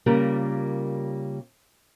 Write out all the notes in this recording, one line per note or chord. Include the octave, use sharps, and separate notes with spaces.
C#3 G3 A#3 F4 G4 A#4